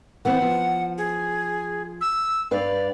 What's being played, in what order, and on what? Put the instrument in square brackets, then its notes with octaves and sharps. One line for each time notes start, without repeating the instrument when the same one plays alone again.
[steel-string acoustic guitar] E3 B3 C4 [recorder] F#5
[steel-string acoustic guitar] F3
[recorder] G#4
E6
[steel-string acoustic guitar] G2 B4 F5 [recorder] D5